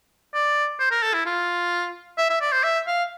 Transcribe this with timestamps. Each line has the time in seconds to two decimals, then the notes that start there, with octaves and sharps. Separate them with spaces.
0.34 D5
0.80 C5
0.91 A#4
1.03 A4
1.14 E4
1.26 F4
2.18 E5
2.30 E5
2.41 D5
2.52 C5
2.64 E5
2.87 F5